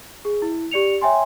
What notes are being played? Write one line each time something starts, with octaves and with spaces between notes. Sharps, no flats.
G#4
E4
G4 D5 C#7 F7
C#5 E5 G5 G#5 C6